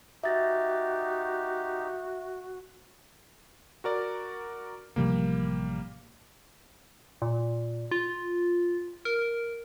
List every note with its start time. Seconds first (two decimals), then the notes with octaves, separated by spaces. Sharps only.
0.24 D#4 F#4 G4 E5 A6 A#6
3.84 F#4 A#4 D5
4.96 A1 C3 F3 G3 A#3
7.22 A#2
7.91 F4
9.05 A#4